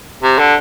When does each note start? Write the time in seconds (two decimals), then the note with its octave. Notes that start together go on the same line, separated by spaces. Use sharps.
0.23 C3
0.39 D3